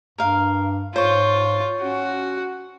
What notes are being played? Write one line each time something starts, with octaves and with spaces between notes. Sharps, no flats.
G2 A#4 F5
G#2 F4 C5 C#5 C#6
C#4 F#4